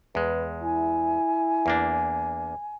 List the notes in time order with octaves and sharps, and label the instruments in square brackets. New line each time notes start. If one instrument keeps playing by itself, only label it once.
[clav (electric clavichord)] E2 G#3 [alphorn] B4
[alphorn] E4 [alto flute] G#5
[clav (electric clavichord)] E2 A#3 D4